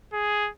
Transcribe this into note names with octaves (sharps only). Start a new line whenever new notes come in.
G#4